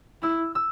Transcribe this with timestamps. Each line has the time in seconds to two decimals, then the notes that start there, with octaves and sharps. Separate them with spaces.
0.22 E4 E6
0.55 E6